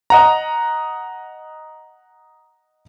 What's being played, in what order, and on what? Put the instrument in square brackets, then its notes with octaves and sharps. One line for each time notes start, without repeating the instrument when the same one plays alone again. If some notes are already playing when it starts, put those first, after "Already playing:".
[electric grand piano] D#5 F#5 A#5